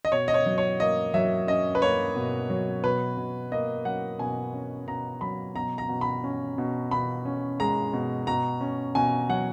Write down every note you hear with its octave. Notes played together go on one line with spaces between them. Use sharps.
D#5
B2 C#5
D#5
C#5
F#3
C#5
A#3 D#5
F#3 E5
C#4 D#5
B4
A#3 C#5
B2
F#3
B2 B4
B2
A#3 D#5
F#3 F#5
B2 G#5
C#4
B2 A#5
F#3 B5
B2 A#5
A#5
B2
B5
C#4
B2
B2 B5
C#4
G#3 A#5
B2
B2 A#5
C#4
B2 G#5
F#3 F#5